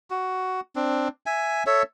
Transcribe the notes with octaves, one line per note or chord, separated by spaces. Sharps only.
F#4
C4 D4
E5 G#5
A4 C#5 E5